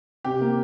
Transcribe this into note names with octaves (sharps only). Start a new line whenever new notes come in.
C3 G4
A#3